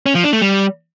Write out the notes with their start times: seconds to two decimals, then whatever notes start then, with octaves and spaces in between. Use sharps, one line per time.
0.06 C#4
0.15 F3
0.24 D4
0.33 A3
0.42 G3